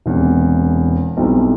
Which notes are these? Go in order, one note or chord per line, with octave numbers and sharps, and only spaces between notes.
E1 E2 C3
B1 B2 G3 C4 E4